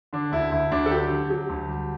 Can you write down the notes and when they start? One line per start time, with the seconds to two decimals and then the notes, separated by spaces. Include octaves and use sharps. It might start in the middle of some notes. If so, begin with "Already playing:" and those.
0.13 D3 D4
0.32 D2 E4
0.51 D2 E4
0.71 D2 D4
0.86 A4
0.91 F#3 G4
1.10 D3
1.30 F#3
1.49 D2
1.68 G3